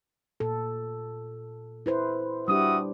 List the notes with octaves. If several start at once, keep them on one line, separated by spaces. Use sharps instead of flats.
A#2 A4
E4 B4 C5
G3 D4 E4 F#4 G4 D#6